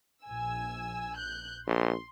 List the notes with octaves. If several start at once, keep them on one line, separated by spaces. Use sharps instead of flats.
A#1 G#5 E6
F#6 G6
A#1 C6